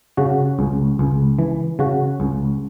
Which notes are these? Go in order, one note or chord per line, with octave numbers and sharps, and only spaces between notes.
C#3 F#4
C#2
C#2
E3
C#3 F#4
C#2